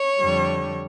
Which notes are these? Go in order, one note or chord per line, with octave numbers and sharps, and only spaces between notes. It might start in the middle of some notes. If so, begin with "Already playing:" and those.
Already playing: C#5
F2 D3 G3